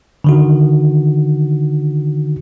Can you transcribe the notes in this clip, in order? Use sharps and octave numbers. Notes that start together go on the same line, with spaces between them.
D3 D#3 F#4